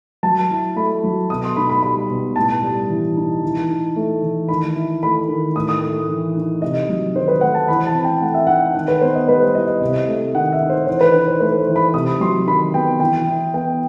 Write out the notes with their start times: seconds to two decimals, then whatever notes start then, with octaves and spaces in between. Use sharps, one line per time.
0.23 F#3 A5
0.50 E4
0.76 A3 B5
1.04 F#3
1.30 B2 D#6
1.44 C6
1.57 D#4 B5
1.70 B5
1.83 G3 B5
2.10 B2
2.36 A2 A5
2.63 G3
2.89 E3
3.17 D#4
3.43 E3
3.69 D#4
3.96 A3
4.22 E3
4.49 D#3 B5
4.75 E4
5.02 A3 B5
5.28 D#3
5.56 A2 D#6
5.69 D#6
5.83 A3
6.08 E3
6.36 D#4
6.62 C3 D#5
6.89 F#3
7.15 D#3 C5
7.28 B4
7.41 A3 F#5
7.55 A5
7.68 E3 B5
7.87 A5
7.94 C4
8.04 G5
8.22 A3 F#5
8.34 E5
8.47 D#4 F#5
8.75 D#3 F#5
8.88 B4
9.01 B3 C5
9.15 D#5
9.28 G3 B4
9.41 C5
9.55 E4 D#5
9.68 D#5
9.81 C3
10.08 A3
10.35 D#3 F#5
10.52 E5
10.61 D#4
10.70 C5
10.87 E3 C5
11.01 B4
11.14 D#4
11.28 C5
11.40 A3 B4
11.58 C5
11.68 E3
11.76 B5
11.94 C3 D#6
12.21 F#3 C6
12.47 D#3 B5
12.74 B3 G5
13.00 E3 G5
13.27 E4
13.54 B3 G5